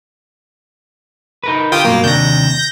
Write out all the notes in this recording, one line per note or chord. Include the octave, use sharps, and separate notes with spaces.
D#4 A#4 B4
D3 F4 G4 G5 D#6
G2 B2 F#3 A#3
D#2 C3 D4 G6 A#6